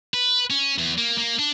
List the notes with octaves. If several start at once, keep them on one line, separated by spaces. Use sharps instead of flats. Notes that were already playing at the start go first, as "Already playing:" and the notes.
B4
C#4
E2
A#3
A#3
D4